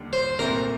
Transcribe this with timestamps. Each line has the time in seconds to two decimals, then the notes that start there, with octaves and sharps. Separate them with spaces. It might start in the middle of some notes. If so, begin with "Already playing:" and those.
Already playing: D#2 D3 G3
0.13 C5
0.39 C2 A#2 A3 C4 A#4